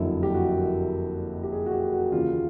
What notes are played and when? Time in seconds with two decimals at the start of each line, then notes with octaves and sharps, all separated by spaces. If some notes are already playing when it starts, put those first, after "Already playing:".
Already playing: F#1 F2 D3 F#3 E4
0.23 G4
0.34 F#4
1.43 G4
1.52 G#4
1.66 F#4
1.72 G4
1.93 F#4
2.12 D#2 C#3 E3 F4